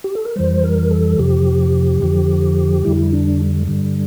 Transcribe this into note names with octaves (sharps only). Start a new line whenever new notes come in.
G4
A4
A#4
F2 E3 G3 C5
A#4
A4
F2 C3 F3 G4
F2 D3 F3
F2 D3 G3 E4
D4
G2 D3 G3